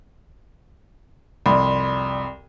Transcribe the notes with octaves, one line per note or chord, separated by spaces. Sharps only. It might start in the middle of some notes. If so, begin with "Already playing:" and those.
C2 F2 D5 B5 C6